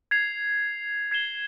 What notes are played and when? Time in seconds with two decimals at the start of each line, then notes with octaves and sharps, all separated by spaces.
0.11 G#6 C7 F7
1.11 G#6 C7 E7 G7